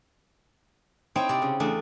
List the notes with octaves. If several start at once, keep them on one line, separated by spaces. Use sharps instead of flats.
C4 D#4 E4 C5 C#5 G5
C3 D5 C6
C#3
E2 A3 D4 E5